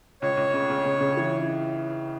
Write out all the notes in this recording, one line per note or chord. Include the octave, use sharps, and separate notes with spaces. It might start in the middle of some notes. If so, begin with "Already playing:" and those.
C#2 C#5
C#2
C#3
C#3
C#3
C#3
E3